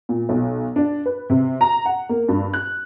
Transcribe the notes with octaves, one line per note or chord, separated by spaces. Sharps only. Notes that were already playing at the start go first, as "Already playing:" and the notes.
A#2
B1
D4
B4
C3
A#5
F#5
A#3
G2
F#6